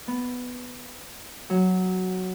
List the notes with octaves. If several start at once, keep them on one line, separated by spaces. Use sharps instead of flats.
B3
F#3